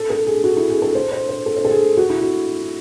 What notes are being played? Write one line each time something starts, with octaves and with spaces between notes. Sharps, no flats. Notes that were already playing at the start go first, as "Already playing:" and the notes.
Already playing: A4
A4
G#4
F#4
E4
G#4
A4
C5
C5
C5
A4
C5
A4
G#4
F#4
E4
F#4